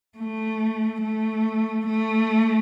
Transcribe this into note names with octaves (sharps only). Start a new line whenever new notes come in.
A3
A3
A3